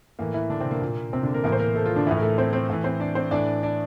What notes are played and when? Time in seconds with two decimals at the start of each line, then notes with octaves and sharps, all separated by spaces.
0.19 A2 E3 A#3
0.34 E3 E4
0.50 D3 D4
0.61 C3 C4
0.71 A#3
0.82 A#2
1.13 C3 C4
1.23 D3 D4
1.33 A#3 A#4
1.43 A2 E3 A#3 A#4
1.52 C5
1.59 A#3 A#4
1.75 A3 A4
1.86 F3 F4
1.96 D3 D4
2.06 A2 E3 E4
2.17 A#4
2.22 A3 A4
2.38 C4 C5
2.53 C4 C5
2.70 A2 E3
2.84 C4 C5
3.00 D4 D5
3.15 C4 C5
3.31 A2 E3 D4 D5
3.63 D4 D5